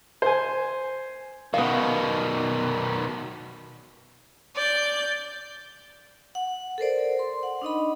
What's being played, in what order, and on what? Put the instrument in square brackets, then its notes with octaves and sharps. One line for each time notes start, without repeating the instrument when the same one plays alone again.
[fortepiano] C5 G#5
[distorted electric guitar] B2 D#3 [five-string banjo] B3 F5
[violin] D5 G6
[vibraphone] F#5
A4 A#4 C5 D5
C6
F#5
D4 D#4 D#5 B5